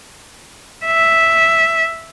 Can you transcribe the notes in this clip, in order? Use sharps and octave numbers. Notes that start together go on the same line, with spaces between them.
E5